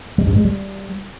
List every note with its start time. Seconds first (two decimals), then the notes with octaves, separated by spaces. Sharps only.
0.18 G3
0.27 G2
0.36 G#3
0.45 G3